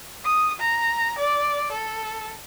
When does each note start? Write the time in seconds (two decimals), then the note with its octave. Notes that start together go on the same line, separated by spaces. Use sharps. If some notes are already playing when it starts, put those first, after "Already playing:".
0.25 D#6
0.60 A#5
1.19 D5
1.72 A4